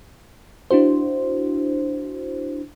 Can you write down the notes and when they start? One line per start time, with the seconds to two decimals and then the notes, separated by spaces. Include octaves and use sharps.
0.71 D4 E4 F#4 C5